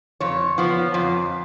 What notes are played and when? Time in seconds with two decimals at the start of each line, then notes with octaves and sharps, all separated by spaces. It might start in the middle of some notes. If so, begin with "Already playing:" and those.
0.20 F2 C#5
0.58 F3 B3
0.94 F2